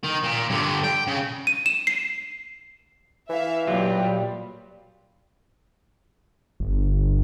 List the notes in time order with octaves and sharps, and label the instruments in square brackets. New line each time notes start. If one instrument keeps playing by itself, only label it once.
[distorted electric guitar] D#3
A#2
G2 D3
G5
C#3
[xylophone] D#7
E7
C7
[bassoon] E3 [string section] E5 F5
[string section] A#2 G3 [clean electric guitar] F#3 F4
[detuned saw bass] G1